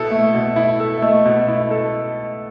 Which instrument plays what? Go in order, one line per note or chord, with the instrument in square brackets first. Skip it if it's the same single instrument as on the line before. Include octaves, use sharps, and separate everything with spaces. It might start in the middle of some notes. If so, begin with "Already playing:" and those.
Already playing: [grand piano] B2 E4 A4
[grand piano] A3 [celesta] E5
[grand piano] B2
E4
A4
[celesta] E5
[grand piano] A3 [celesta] D#5
[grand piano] B2
E4
A4